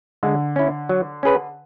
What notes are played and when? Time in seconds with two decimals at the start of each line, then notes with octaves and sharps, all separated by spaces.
0.23 D3 G#3
0.56 C#4 E4
0.89 F#3
1.23 C#4 G#4 B4